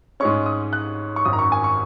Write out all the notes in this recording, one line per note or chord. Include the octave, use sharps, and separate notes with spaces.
G#2 G#3 C#4 C#6
D#6
F#6
C#6
G#1 F#2 D#3 D#6
A#5
C#6
G#5
C#6